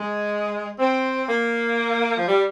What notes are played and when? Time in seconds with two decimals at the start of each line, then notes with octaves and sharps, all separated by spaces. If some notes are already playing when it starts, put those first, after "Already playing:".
Already playing: G#3
0.79 C4
1.28 A#3
2.17 F3
2.28 G3